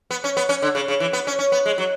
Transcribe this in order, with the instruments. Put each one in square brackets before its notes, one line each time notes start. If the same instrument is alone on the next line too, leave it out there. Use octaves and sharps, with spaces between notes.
[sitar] B3
C#4
B3
C#4
D3
C#3
C#3
E3
B3
C#4
C#4
B3
G#3
F#3